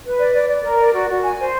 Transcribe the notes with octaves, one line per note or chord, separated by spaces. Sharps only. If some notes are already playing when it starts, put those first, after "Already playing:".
B4
D5
D5
D5
A#4
D5
F#4
F#4
G#5
C5